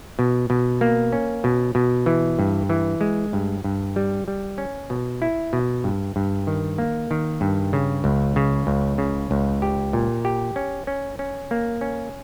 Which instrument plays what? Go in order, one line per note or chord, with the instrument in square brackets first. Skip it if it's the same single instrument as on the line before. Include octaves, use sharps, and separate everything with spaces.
[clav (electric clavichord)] B2
B2
A#3
C#4
B2
B2
E3
G2
E3
G#3
G2
G2
G3
G3
C#4
B2
E4
B2
G2
G2
D#3
A#3
D#3
G2
C#3
C#2
C#3
C#2
C#3
C#2
G4
A#2
G4
C#4
C#4
C#4
A#3
C#4